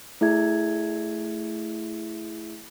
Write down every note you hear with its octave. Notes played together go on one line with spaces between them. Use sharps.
A3 E4 G#4 E5 G#6